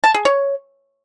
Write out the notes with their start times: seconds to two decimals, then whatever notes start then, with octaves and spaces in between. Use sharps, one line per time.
0.04 A5
0.14 G#4
0.25 C#5